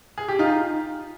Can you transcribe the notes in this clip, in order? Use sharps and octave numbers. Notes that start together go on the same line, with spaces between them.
G#4
G4
D#4 F4